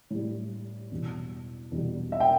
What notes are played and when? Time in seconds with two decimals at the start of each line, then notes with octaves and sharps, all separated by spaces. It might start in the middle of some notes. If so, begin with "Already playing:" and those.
0.10 A2 G3
0.91 E2 B2 G3
1.71 E2 B2 G3
2.12 E5
2.20 G5